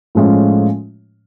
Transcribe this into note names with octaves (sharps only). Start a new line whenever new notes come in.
A2 F3 G#3 C#4 F4